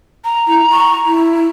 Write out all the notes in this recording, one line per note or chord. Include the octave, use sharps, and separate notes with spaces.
A#5
E4
C#6
E4